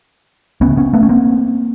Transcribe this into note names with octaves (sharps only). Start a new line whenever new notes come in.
D2 C#3 B3 C#4
B3 C#4
A3 B3
C#4
A#3 C4